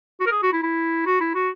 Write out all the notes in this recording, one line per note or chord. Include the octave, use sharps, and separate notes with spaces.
F#4
A#4
G#4
F#4
E4
E4
F#4
E4
F#4